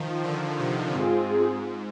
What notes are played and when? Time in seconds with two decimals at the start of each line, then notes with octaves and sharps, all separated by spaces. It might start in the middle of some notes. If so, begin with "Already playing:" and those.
Already playing: D#3 F3
0.24 D3
0.60 C3
0.95 G#2 G#3 C4 F4 G#4